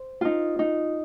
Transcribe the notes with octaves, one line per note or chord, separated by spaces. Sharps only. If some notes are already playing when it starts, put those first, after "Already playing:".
Already playing: C5
D#4 F4
D#4